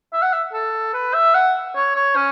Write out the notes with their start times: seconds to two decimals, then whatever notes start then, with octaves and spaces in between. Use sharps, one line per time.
0.13 E5
0.22 F#5
0.33 E5
0.53 A4
0.94 B4
1.14 E5
1.35 F#5
1.76 C#5
1.95 C#5
2.16 C#4